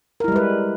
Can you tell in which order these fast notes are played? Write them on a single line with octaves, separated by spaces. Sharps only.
A#4 E4 G3 G#3 B4